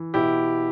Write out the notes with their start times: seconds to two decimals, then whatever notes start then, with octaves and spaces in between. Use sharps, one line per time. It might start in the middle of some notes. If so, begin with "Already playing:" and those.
Already playing: E3
0.14 B2 E4 G4